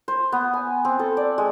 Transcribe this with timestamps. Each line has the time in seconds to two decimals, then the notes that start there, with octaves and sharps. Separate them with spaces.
0.08 C5
0.32 B3
0.53 G#5
0.85 C4
0.99 A4
1.17 D5
1.38 G#3